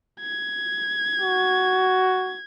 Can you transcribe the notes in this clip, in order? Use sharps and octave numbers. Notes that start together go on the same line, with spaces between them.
G#6
F#4